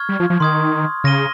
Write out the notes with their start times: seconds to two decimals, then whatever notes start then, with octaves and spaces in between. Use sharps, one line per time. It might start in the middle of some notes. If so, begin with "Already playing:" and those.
Already playing: C#6 F6 G#6
0.09 G3
0.20 F3
0.30 F3
0.40 D#3 C6 D#6 G#6
1.04 C#3 F6 A#6 D#7 G7